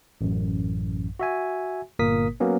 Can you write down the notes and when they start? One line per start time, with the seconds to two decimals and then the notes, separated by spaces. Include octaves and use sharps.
0.21 A1 F#2
1.20 F#4 E5 G#5
1.99 G1 A#2 A#3 A#4 D#6 B6
2.40 F#3 A#3 B3 C#4